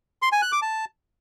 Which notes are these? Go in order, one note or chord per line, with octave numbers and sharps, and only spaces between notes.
C6
G#5
F#6
D6
A5